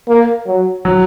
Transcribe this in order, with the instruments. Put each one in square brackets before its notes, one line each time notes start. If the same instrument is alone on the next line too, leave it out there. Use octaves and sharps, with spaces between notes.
[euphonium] A#3
F#3
[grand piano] F#3